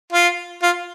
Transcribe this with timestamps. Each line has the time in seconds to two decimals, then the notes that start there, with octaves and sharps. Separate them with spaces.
0.13 F4
0.63 F4